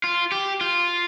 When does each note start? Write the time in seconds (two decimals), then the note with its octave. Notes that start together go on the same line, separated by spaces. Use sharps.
0.04 F4
0.32 G4
0.61 F4